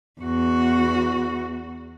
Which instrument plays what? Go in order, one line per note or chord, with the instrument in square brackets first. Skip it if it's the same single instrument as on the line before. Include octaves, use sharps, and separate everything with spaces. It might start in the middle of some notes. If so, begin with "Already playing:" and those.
[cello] E2 F#4